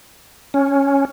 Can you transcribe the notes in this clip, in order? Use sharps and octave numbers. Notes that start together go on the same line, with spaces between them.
C#4